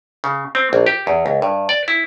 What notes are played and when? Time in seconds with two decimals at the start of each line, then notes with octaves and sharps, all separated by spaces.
0.24 C#3
0.55 C4
0.73 A#1
0.86 G4
1.07 E2
1.26 C#2
1.42 G2
1.69 D5
1.88 E4